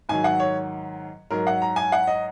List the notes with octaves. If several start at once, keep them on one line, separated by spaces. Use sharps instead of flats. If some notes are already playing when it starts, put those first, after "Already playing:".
G#2 D#3 F#3 G#5
F#5
C#5
G#2 F#3 A#4
F#5
A#5
G#5
F#5
D#5